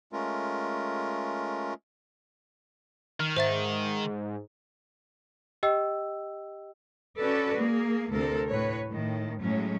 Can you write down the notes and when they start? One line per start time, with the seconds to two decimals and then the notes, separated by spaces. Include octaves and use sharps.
0.12 G#3 A3 C#4 F4 A#4
3.20 D#3 F6
3.37 G#2 C5 E5 A6
5.63 G4 D#5 G5 E6
7.18 C#4 F#4 A4 B4 D5
7.58 A#3 G#4
8.12 D2 C3 A4 A#4 C5
8.49 A2 B4 C#5
8.88 A2 D#3
9.40 A2 F#3 G#3 C#4